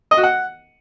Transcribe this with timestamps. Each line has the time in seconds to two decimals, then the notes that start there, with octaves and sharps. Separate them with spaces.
0.11 D#5
0.17 F#4
0.23 F#5